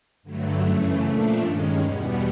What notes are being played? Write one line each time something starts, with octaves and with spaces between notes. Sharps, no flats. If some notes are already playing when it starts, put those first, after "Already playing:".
G2 D3 F#3 A3
F#2 C#3 E3 A3
A#2 F3 A3 D4
G2 D#3 G#3 C#4
E2 B2 G3 B3